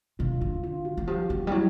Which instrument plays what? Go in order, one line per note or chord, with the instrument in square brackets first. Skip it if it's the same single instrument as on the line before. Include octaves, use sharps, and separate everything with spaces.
[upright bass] B2 [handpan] F4
[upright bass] D3 [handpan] F4
[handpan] F4
F#4
[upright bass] E3
[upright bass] F3 [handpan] G4
[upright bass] F3 [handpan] F#4
[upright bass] G3
[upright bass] F#3 [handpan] E4